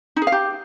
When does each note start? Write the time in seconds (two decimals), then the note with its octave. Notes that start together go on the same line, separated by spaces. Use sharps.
0.16 D#4
0.22 G#4
0.27 F5
0.32 G4